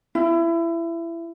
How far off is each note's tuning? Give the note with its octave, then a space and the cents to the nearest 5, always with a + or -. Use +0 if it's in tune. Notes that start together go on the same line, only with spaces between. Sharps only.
E4 +25